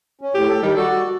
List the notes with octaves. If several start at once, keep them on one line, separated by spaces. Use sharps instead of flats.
C#4
A2 G4
A4
D#3 G3
F#4 A4 D5